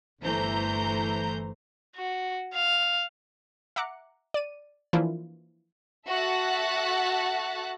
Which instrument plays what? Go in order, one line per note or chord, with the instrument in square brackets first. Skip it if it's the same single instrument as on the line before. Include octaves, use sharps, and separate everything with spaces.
[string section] G1 E3 A3 C5 A#5 G6
[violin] F#4
F5
[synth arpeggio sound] E5 F#5 A#5 D6 F#6 C#7
D5 D#7
E3 F3 A#3 D4 E4 F4
[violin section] F#4 A4 E5 F#5 F#6 A6